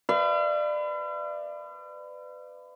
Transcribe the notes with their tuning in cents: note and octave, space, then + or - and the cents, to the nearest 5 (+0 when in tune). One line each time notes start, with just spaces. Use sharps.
B4 +30 D5 +25 F5 -45